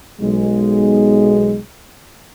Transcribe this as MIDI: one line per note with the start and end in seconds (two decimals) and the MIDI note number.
0.21 1.58 35
0.21 1.58 56